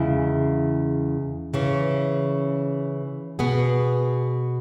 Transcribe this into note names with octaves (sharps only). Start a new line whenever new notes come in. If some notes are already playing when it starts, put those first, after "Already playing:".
Already playing: E2 C#3 G#3 E4
C#3 E3 C#4
B2 B3 G#4